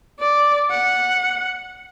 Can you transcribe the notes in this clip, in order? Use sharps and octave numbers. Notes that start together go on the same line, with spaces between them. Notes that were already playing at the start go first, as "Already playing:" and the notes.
D5
F#5